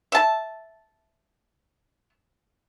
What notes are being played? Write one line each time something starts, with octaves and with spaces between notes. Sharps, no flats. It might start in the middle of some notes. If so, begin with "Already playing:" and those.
E5 A5